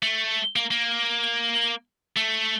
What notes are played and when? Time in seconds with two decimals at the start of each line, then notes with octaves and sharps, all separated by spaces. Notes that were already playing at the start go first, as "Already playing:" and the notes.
0.02 A3
0.56 A#3
0.71 A#3
2.16 A3